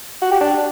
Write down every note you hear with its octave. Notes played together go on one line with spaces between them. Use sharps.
F#4
G4
D4